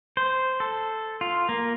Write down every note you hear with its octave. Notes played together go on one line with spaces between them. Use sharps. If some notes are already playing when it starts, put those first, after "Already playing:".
C5
A4
F4
A#3